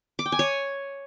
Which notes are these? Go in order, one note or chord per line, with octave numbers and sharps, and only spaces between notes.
D6
G5
G#5
C#5